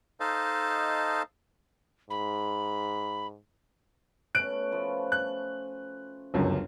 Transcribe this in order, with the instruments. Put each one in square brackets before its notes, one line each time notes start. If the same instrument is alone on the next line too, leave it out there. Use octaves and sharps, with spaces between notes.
[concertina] D#4 A4 C5 D#5 F5 A5
[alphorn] G#2 [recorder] B5
[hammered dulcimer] B2 A3 C#4 [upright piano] F#6 D7
[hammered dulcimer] F3 A3 B4
[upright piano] F#6
G1 C#2 F#2